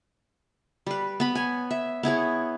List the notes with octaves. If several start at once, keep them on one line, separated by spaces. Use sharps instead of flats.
G3 B4
B3 B5
C#5 G#5
E5
B3 E4 G#4 C#5